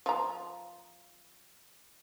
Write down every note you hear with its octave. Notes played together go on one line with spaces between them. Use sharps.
F3 A#5